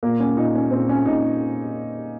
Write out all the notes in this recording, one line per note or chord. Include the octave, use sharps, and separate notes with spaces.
A#2 A#3
C#4
A#2 D#4
C#4
A#2 C4
C#4
A#2 D#4